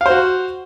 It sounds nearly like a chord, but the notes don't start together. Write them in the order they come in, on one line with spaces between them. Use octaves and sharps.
F5 C5 F#4